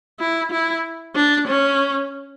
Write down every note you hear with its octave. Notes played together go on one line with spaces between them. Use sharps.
E4
E4
D4
C#4